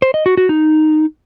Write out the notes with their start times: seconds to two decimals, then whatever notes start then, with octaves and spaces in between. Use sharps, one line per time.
0.02 C5
0.14 D#5
0.26 F#4
0.37 F#4
0.49 D#4